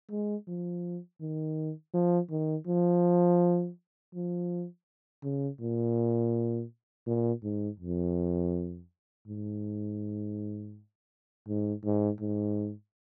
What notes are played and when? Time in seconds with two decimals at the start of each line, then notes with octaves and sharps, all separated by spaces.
0.11 G#3
0.48 F3
1.21 D#3
1.94 F3
2.30 D#3
2.67 F3
4.14 F3
5.23 C#3
5.61 A#2
7.07 A#2
7.44 G#2
7.80 F2
9.28 G#2
11.48 G#2
11.84 G#2
12.21 G#2